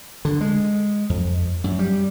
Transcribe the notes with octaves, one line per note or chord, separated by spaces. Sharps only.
D3
G#3
F2
F#2
G3